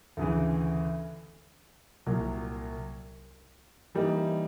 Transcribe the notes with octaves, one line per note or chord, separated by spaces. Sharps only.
D2 C#3 E3
C2 A#2 F#3
E3 G3 A#3 D#4